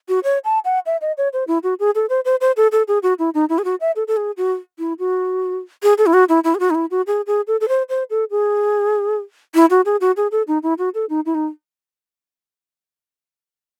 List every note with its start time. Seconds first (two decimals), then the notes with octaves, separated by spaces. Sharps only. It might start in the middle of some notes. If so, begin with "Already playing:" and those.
0.09 F#4
0.24 C#5
0.45 A5
0.65 F#5
0.86 E5
1.01 D#5
1.18 C#5
1.33 C5
1.47 E4
1.63 F#4
1.80 G#4
1.95 A4
2.10 C5
2.25 C5
2.41 C5
2.57 A4
2.72 A4
2.88 G#4
3.03 F#4
3.19 E4
3.34 D#4
3.49 E4
3.58 G#4
3.65 F#4
3.81 E5
3.96 A4
4.08 A4
4.17 G#4
4.37 F#4
4.79 E4
4.99 F#4
5.83 G#4
5.98 A4
6.06 E4
6.13 F#4
6.29 E4
6.44 E4
6.55 G#4
6.60 F#4
6.70 D#4
6.75 E4
6.91 F#4
7.07 G#4
7.27 G#4
7.47 A4
7.61 A4
7.68 C5
7.89 C5
8.10 A4
8.31 G#4
9.55 E4
9.70 F#4
9.86 G#4
10.01 F#4
10.17 G#4
10.32 A4
10.48 D#4
10.63 E4
10.78 F#4
10.95 A4
11.10 D#4
11.26 E4
11.35 D#4